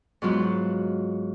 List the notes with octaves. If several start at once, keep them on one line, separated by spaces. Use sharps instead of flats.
G#2 F#3 B3 F4 F#4